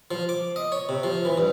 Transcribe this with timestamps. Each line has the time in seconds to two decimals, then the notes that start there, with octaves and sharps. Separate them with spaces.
0.11 F3
0.29 D6
0.56 D#5
0.72 C#5
0.89 C3
1.03 F3
1.25 E3
1.37 G2